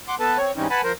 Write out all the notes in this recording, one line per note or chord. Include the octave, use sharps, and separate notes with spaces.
F#5 C6 D6
B3 A4 B4 A5
C4 C#5
G#2 E3 G3 C4 C#4 D#4
B4 F#5 G#5 A5 B5
F3 A#4 C5